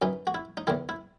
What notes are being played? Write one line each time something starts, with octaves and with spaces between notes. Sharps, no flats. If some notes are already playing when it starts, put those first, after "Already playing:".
F#2 E3 D#4
F#4
E4
D#4
E2 D#3 E4
E4